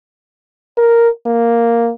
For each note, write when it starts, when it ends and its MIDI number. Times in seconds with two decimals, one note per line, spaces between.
0.77 1.08 70
1.26 1.90 58